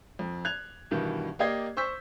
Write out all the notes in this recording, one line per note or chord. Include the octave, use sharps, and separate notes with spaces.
F2
F#6 G#6 F7
G2 B2 D#3 E3
A#3 G4 D5 D#5 G#6 C7
C5 C#6 E6 G6 B6